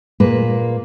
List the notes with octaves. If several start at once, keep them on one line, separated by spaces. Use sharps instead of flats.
A#2 A#3 G#4 B4